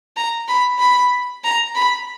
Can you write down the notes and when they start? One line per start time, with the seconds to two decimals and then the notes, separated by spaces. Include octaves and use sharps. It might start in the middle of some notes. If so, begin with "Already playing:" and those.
0.17 A#5
0.48 B5
0.79 B5
1.44 A#5
1.75 B5